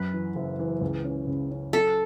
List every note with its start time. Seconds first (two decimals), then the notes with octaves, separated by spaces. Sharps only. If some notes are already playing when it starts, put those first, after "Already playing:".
Already playing: F#2 B4
0.13 E3
0.36 F#1
0.59 E3
0.81 C#2
1.04 C#4
1.27 C#3
1.51 C#4
1.73 F#3 A4